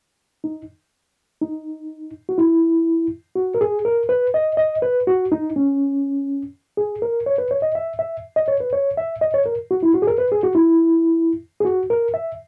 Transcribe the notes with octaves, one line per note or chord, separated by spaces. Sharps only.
D#4
D#4
F#4
E4
F#4
A#4
G#4
A#4
B4
D#5
D#5
B4
F#4
D#4
C#4
G#4
A#4
C#5
B4
C#5
D#5
E5
E5
D#5
C#5
B4
C#5
E5
D#5
C#5
A#4
F#4
E4
F#4
G#4
A#4
B4
G#4
F#4
E4
G#4
F#4
A#4
E5